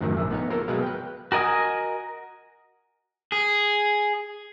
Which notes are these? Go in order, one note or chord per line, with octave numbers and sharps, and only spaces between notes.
F#2 A2 D#3 F3
A#1 D3 A3
B3 D#4 C#5
A#3 F4 A4 A#4 C5
B2 F#3 G#3 B4 F5
B4 G5
F#4 A#4 D#5 G#5 D#6
G#4